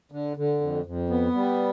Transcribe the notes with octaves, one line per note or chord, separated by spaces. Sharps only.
D3
D3
F2
F2
B3
G3